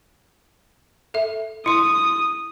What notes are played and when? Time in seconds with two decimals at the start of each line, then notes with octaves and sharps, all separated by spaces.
1.14 A4 E5
1.66 E4 C6 D#6